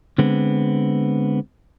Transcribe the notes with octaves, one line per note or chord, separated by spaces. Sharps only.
D3 G#3 B3 C4